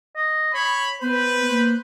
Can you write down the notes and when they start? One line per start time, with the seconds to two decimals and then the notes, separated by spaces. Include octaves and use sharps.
0.16 D#5
0.54 C#5 B5
1.02 B3 B4 C5
1.50 A#3 C5